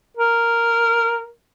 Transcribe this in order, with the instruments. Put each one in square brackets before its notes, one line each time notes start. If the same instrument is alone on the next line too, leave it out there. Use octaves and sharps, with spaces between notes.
[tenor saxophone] A#4